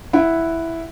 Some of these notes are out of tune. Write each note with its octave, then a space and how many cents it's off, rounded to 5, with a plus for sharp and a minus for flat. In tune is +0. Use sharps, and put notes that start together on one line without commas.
E4 +0 F#5 +0